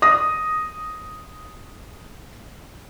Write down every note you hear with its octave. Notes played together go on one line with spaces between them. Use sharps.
D#6 A#6